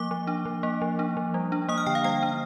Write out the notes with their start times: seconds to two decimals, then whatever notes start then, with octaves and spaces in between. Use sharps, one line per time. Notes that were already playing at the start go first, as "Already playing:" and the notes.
Already playing: F3 A#3 D6
0.11 F3
0.27 D4
0.45 F3
0.63 A#3
0.82 F3
0.99 D4
1.17 F3
1.34 G3
1.52 D4
1.69 A#3 D#6
1.78 F6
1.86 D3 G5
1.95 F5
2.04 G3 G5
2.23 D4